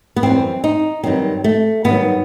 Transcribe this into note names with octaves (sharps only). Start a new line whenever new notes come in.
B3
F#2 E3 G3 C4
D#4
G2 D#3 F#3 C4
A3
G2 D#3 F#3 B3